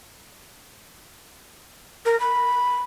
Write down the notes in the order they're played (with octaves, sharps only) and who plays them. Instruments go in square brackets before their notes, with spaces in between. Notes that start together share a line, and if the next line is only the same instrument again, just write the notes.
[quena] A#4
B5